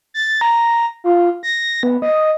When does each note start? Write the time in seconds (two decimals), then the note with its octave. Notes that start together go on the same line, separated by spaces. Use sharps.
0.14 A6
0.41 A#5
1.04 F4
1.43 A#6
1.83 B3
2.02 D#5